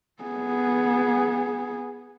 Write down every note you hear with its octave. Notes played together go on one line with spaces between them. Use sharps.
B3 G#4